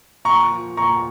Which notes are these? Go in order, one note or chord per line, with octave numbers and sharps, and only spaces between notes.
A#2 A#5 C#6
F3
A#2 A#5 C#6